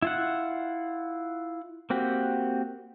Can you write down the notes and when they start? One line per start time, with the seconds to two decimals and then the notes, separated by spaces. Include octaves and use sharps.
0.02 E4 F4 F#5
1.90 A#3 C4 F#4 G4